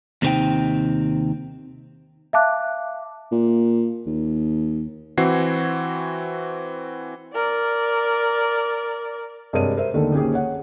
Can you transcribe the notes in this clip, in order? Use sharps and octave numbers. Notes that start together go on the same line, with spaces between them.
D#2 C3 E3 C4 D#4 G5
E5 F5 A5 D6 F#6
A#2
D#2
E3 C4 F#4 G#6 C7
A#4 D5
G2 C3 G#3 A#4 C#5 D#7
A#4 C5 E5
D#2 D3 D#3 A3
A#1 D#3 C#4 G4 G#4
C#5 F#5